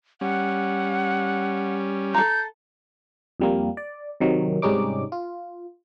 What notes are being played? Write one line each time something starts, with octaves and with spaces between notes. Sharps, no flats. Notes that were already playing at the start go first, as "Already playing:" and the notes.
G3 C#4 F#5
A4 A#5 G6
F2 G3 A#3
D5
C3 D#3 F#3
G#2 C3 G3 C#4 D#4 D6
F4